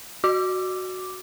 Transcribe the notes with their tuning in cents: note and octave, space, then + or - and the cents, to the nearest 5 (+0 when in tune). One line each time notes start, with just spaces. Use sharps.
F#4 +0 D6 +0